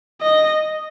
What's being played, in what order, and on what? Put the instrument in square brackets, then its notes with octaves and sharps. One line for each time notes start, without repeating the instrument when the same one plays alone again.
[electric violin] D#5